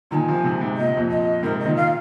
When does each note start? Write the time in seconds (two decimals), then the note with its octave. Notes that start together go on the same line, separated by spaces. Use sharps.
0.11 A#2 D#3 G#5 A#5
0.28 C3 F3
0.44 G#2 C3
0.61 G#2 C3
0.77 A#2 D#5
0.88 C3
0.97 F2 A#2
1.10 D#5
1.43 G#2 C3 A#4
1.59 D#5
1.65 A#2 D#3
1.76 F5